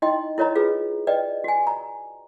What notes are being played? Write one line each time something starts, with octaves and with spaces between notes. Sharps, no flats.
D#4 E4 D#5 G5 C6
E4 A#4 C#5 D#5 A#5
F4 G#4 B4
B4 D5 D#5 G5
F#4 G#5
A#5